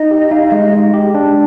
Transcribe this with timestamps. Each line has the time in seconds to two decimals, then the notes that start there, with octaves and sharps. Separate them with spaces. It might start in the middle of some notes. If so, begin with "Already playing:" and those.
Already playing: D#4 D#5
0.11 G4
0.31 D#4 F5
0.51 G#3 D#5
0.72 G#3
0.94 G4
1.15 D4